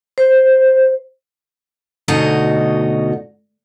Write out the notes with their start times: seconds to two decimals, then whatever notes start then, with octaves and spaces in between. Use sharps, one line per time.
0.18 C5
2.08 D2 B2 D#4 F#4